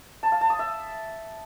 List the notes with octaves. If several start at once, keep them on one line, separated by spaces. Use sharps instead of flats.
A5
F5
A5
D#6
E5